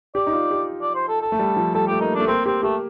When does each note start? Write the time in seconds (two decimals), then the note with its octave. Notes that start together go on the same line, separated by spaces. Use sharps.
0.15 G4 D5
0.27 D#4
0.33 F4
0.51 G4
0.82 D5
0.95 C5
1.08 A4
1.22 A4
1.32 A3
1.39 G3
1.56 F3
1.75 G3 A4
1.87 A3 G4
2.01 A#3 D#4
2.15 D4
2.20 A3
2.27 A#3 C4
2.45 C4 G4
2.63 A3 G4